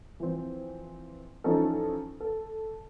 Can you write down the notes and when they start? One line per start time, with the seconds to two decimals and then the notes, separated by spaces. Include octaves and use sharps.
0.20 E3 F3 C4
1.44 E3 F3 C#4 D#4 A4
2.20 A4